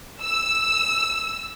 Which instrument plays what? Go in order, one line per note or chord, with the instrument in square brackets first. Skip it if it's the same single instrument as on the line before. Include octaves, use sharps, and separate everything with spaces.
[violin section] E6